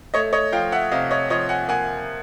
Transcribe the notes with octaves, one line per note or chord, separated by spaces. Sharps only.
A3 C#5 D#5
C#5 D#5
F3 F5 G5
E5 F#5
C3 D#5 F5
C#5 D#5
F3 C#5 D#5
F#5 G#5
A#3 F#5 G#5